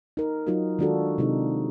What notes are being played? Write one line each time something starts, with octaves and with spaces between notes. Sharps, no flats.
D#4 A#4
F#3 D#4 F4 F#4 A#4
D#3 G#3 D4 F4 F#4 A4
C3 G#3 D#4